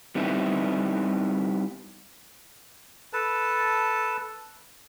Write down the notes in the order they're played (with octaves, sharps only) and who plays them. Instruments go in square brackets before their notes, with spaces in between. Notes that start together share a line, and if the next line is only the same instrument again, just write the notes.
[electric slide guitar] G3 B3 C4 D#4 E4
[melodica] A4 B4 A5